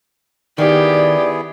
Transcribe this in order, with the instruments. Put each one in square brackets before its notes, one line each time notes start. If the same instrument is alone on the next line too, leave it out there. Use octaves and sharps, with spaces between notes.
[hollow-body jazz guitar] D#3 [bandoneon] B3 E4 G#4 [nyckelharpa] G4 [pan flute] D5